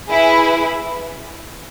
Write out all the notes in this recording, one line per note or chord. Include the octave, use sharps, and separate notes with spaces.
E4 G#4 B4